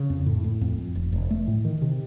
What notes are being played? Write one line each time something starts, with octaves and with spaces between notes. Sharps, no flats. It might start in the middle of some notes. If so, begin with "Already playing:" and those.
Already playing: C#3
F2
A2
A2
F2
F2
F1
F1
A3
A2
D#3
C3